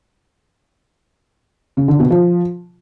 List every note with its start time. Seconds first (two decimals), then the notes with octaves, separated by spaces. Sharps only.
1.77 C#3
1.88 D3
1.99 B2
2.10 F3